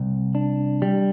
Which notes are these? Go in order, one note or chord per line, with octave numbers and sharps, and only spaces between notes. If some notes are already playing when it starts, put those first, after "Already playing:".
Already playing: C2
D4
G3